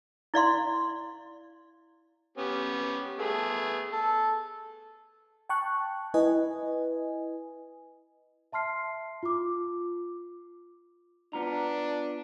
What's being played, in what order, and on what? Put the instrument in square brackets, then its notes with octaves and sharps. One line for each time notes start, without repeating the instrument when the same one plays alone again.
[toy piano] E4 D5 F5 C6
[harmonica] B3 C#4 G4
A3 B3 G#4
A4
[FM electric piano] G5 A5 C#6 F#6
E4 B4 D#5 G#5
[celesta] E5 A5 C6 F6 C7
F4 D6
[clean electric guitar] B3 F4 A#5 [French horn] D4